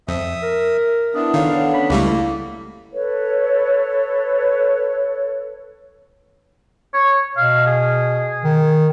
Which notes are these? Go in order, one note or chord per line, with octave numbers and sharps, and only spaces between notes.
F2 E5 D#6
A#4
B3 D4 E4 E5 D#6
D#3 A4 C#5 F5 F#5
C#4 B5
C#2 G3 A3 A#3 E4
A4 B4 C#5
C#5
B2 F5
G#4
D#3